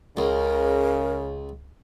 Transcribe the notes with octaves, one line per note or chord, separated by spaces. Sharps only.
C#2 C#3 A#4